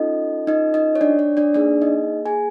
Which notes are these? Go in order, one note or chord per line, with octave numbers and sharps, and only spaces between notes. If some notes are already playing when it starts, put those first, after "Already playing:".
Already playing: C#4 D#4 F4 A4 D#5
D#4 D#5
D#4 D#5
C#5
D4 D5
C#5
D4 D5
A#3 D4 D#4 G#4 D5
D#4 D#5
G#4 G#5